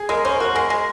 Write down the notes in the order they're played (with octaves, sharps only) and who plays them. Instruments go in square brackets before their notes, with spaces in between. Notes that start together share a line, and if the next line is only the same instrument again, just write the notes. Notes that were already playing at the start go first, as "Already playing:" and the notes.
Already playing: [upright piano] G#4
[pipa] G#3 [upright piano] A#4
[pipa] C#4 [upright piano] C5
[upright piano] A#4
[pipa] F#4 [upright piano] C5
[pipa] G#3 [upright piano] A#4
[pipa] G#3